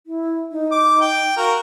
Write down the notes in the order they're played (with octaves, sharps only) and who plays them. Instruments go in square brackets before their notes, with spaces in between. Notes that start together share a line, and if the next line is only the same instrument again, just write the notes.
[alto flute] E4
D#4
[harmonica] D6
G5
[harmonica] F#4 A#4 [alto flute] F5